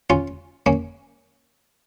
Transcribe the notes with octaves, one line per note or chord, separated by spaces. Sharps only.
C#4 F4
A#3 C#4